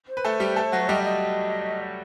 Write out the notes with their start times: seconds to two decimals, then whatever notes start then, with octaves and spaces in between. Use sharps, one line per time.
0.09 C5
0.17 B4
0.25 A3 A4
0.40 G3 G4
0.56 A3 A4
0.72 F#3 F#4
0.88 G3 G4 D#5
1.04 D#5